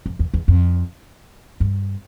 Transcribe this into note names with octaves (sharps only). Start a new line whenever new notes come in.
F2
E2
E2
F2
G2